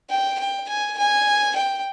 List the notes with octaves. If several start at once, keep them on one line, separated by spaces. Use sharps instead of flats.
G5
G5
G#5
G#5
G5